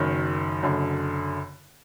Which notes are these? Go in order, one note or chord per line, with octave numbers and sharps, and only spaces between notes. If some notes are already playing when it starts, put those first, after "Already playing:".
Already playing: F#1 F#2 D#3
F#1 F#2 D3